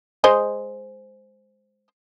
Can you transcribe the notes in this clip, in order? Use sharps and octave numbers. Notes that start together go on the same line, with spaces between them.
G#3 C5 D#5